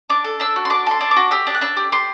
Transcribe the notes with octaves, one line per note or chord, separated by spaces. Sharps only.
D4 D6
A4
D4 E6
F#4
C6
D4 D6
A4 C6
D4
D6
F#4
G4 E6
D4
F#6
D4 E6
G4
G4 C6